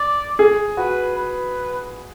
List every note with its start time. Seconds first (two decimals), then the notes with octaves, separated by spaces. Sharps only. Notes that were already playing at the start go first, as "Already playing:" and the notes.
Already playing: D5
0.39 G#4
0.77 F#4 B4
1.16 B4